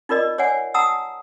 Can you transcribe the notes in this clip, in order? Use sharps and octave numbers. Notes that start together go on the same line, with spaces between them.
D#4 F4 A#4 D5 D#5
C#5 D5 F#5 G#5
F#5 A5 A#5 D#6 E6